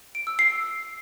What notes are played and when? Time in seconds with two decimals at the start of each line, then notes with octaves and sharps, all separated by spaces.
0.15 D7
0.27 E6
0.39 C7